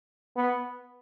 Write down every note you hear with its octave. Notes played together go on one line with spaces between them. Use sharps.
B3